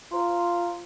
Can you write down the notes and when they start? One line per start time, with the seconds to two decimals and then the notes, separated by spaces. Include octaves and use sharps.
0.11 F4 C5 A#5 C6